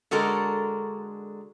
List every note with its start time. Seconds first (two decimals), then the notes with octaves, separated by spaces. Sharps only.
0.11 D3 G#3 F#4 A4 A#4